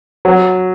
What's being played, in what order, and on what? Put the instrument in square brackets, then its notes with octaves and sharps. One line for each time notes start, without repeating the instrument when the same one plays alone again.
[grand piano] F#3